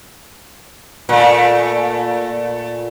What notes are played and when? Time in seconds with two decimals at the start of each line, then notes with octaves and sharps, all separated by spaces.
1.09 A#2 A3